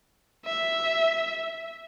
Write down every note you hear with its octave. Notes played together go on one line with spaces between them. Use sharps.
E5